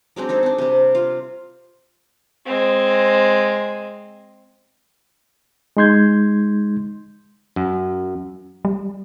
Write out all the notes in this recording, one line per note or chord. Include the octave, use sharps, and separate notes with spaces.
F#3 G#3 C4 D4
D#4 G#4 A4
C4 D4
C3 G3
F4
G#3 C4
G#3 D#4 C6 G6 G#6
F#2
G3